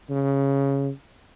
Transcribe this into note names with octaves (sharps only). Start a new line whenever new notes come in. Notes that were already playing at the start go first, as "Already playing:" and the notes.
C#3